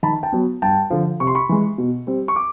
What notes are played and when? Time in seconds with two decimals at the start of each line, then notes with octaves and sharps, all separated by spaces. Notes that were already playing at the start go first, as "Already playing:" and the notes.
0.03 D#3 A5 B5
0.23 G5 A5
0.32 F#3 B3
0.62 G2 G5 A5
0.90 D3 F3
1.20 C3 C#6
1.27 C6
1.35 B5 C#6
1.49 E3 G#3
1.78 B2
2.07 G3 C4
2.28 C#6
2.36 D6